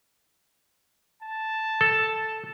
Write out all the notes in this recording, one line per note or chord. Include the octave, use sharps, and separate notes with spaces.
A5
A4